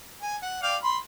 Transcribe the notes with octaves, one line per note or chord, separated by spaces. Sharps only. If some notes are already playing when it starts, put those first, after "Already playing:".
G#5
F#5
D5 F5 G5
B5 C6